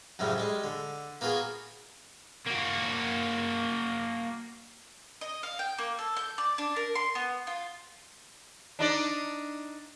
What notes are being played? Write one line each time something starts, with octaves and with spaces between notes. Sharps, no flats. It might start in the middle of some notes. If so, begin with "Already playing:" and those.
F#2 A2 C#3 F3 G3
G3 G#3
D3
A#3 B3 F4 F#4 G#4
A#3 F#4
D#5
F5
G5
A#3
A4
G6
D5
D4
A#4
C6
B3
F4
D4 D#4 D5